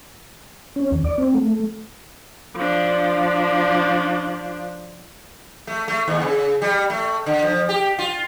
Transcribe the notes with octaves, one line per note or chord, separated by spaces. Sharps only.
C#4
D#2
D5
C4
A3
F3 D4
A3
A3
D#2
C#3
G3
A3
D3
F3
G4
F4